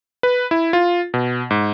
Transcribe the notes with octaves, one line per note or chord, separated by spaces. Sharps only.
B4
E4
F4
B2
G#2